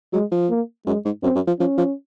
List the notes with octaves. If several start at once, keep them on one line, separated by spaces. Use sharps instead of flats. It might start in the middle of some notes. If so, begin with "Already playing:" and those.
F#3 G#3
F3
A#3
F#2 G#3
G#2
F#2 C4
F#2
F3
F3 C#4
F3